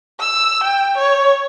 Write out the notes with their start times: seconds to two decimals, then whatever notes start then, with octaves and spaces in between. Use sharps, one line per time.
0.20 E6
0.64 G5
0.98 C#5